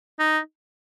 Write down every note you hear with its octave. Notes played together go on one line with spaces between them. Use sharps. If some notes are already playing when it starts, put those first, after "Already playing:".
D#4